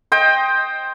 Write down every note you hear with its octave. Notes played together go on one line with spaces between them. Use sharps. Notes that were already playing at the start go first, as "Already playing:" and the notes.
C5 D#5 G5